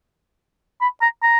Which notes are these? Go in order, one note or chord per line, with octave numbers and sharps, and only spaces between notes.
B5
A#5
A#5